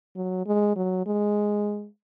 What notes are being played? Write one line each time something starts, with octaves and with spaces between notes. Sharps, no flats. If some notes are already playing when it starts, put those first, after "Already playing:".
F#3
G#3
F#3
G#3